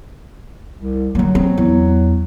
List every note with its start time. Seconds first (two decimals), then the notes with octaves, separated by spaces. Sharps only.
0.77 C2
1.15 D3 F#3 A#3
1.35 C4
1.58 E2